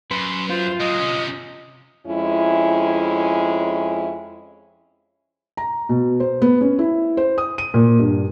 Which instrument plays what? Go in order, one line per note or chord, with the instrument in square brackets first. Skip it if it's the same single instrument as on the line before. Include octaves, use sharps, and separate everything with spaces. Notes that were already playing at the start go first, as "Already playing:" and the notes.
[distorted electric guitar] F#2 [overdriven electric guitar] B4 [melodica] C6
[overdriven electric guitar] F4 [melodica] C5
[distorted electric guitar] F#3 G#3 [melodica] D#5
[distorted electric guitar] C3 C#4
[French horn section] F2 G#3 C#4 E4
[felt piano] A#5
B2
C5
B3
C#4
E4
C5
D#6
D#7
A#2
G2